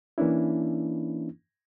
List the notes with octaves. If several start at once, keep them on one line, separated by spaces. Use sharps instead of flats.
E3 A#3 C#4 D4 E4